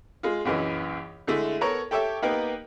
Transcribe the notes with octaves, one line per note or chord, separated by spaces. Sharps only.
G#3 F4
A#1 F#2 E3 D#5
D3 G#3 A3 E4
B3 A4 A#4 C#5 A#5
G4 A4 C#5 E5
A#3 B3 D#4 G4 A#4 B4